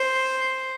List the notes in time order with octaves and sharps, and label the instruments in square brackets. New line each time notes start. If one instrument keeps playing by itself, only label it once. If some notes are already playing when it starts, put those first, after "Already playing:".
Already playing: [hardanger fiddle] C5